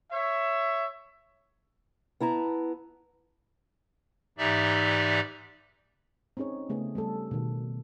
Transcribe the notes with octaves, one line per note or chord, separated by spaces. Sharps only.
C#5 E5
B3 E4 A5 A#5
G#2 E3 D#4 G4 D5 E5
C4 C#4 D#4 G#4 C#5
C#3 A3 B3 G#4
G3 A3 A4
B2 D#3